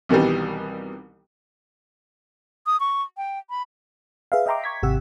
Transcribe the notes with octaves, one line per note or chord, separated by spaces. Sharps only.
C2 B2 D#3 E3 G3
D#6
C#6
G5
B5
G#4 B4 E5 F5
D#5 E5 G5 A#5 C6 D6
C#6 G#6 B6
G#1 C3 G4 F#5 E6